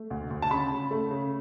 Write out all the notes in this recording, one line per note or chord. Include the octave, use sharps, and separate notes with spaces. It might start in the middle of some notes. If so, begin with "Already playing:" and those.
Already playing: A3
D2
D2
A5
C#3 B5
C#3
A3
C#3